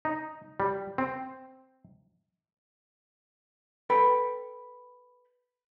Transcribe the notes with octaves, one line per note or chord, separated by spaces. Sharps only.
D#4
G3
C4
A4 B4 G5 B5